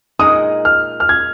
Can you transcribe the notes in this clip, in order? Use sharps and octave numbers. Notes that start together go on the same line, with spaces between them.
A#2 G#3 D#4 G#4 D#5 D#6
F6
F6
G#6